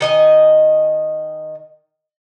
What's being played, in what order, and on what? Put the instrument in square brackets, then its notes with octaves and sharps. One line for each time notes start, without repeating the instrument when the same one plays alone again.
[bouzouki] D#3 D#5 G#5